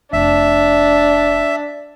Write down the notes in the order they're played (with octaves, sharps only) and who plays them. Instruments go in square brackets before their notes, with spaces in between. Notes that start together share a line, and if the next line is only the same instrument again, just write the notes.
[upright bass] F1 [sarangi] D4 [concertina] E5